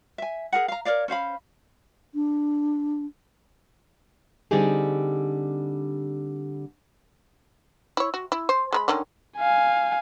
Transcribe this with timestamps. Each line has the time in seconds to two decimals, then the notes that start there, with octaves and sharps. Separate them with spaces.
0.18 E5 G#5
0.52 G#4 A#4 F#5
0.68 F5 A#5
0.85 A#4 C#5 D5 F5
1.08 C#4 C5 F5 B5
2.14 D4
4.51 D3 G3 C4 D#4 G4 G#4
7.97 E4 C#5
8.14 F#4
8.32 E4
8.49 C5
8.72 G#3 A#4 B5
8.88 D3 D#3 C#4
9.38 F5 G#5